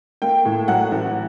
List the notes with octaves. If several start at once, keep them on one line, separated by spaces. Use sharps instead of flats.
A#3 G5
A2
F#3 F#5
A1